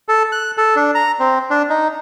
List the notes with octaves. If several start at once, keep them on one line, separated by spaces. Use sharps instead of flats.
A4
F#6
A4
D4
A#5
C4
D4
D#4